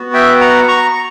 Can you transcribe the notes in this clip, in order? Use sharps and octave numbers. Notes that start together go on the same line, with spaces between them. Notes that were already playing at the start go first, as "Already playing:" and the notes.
Already playing: B3 F#4
E5 G5
F#5 A#5
A#5 C#6